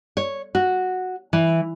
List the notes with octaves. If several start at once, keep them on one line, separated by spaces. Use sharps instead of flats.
C#5
F#4
E3